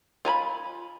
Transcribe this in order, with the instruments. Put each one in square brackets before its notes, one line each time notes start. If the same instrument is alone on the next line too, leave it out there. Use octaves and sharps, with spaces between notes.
[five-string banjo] F4 G#5 A#5 B5